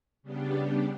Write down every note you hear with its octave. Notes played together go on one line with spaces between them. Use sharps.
C#3 G3 B3 D4 G4